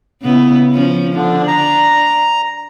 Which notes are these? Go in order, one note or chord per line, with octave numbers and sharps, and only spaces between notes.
C#3 B3 E4
F3 C#4
D3 F3 D4
A#5